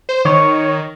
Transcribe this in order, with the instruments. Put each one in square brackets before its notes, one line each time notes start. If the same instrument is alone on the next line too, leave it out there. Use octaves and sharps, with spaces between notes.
[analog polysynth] C5
[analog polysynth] D#3 [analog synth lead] C#5